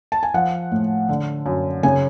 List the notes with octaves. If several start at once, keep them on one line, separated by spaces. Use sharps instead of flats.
A5
G#5
F3 F#5
A2
D3
F#2
C#3 G#5